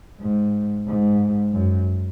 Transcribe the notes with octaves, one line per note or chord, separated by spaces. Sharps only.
G#2
G#2
F#2